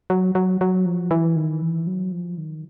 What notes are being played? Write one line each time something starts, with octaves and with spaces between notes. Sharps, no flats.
F#3
F#3
F#3
F3
E3
D#3
E3
F#3
F3
D#3